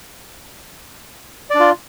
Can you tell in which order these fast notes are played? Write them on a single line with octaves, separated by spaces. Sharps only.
D5 D4 F4